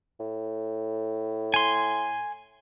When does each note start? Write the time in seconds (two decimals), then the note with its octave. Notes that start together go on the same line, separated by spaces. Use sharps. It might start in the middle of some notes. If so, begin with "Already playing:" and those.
0.20 A2
1.54 G#5 C6